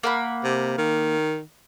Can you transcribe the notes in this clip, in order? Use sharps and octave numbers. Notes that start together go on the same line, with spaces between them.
A#3 F#5 B5
C3
D#3